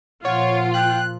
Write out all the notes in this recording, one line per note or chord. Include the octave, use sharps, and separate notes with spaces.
A#2 F3 F4 C#5 F#5
G5 F#6